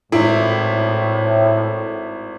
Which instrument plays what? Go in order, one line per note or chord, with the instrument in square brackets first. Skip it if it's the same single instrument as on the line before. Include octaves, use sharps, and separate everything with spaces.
[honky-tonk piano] G#1 E4 [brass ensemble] A2